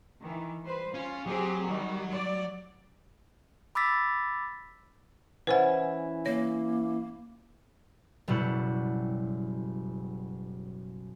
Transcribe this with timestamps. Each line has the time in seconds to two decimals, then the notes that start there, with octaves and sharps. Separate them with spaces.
0.21 D#3 E3
0.65 G3 B4 C5
0.94 C#4 F4
1.26 F#3 C4 G4 G#4
1.67 D#3 G3
2.11 D5
3.75 B5 D6 E6 A6 B6
5.47 E3 C#4 E4 B4 C5 F#5
6.26 A#3 C#5
8.28 F#1 B2 G3 E4 F#5